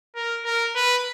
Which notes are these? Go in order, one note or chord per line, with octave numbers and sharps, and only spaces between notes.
A#4
A#4
B4